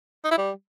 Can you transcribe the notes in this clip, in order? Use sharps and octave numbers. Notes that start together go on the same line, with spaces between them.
D#4
E4
G3